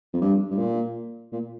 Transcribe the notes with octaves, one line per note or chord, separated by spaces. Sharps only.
F2
G2
G2
A#2
A#2